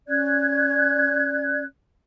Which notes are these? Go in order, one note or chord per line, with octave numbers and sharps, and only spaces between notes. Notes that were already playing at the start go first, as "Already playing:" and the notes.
C#4 D5 F#6 G#6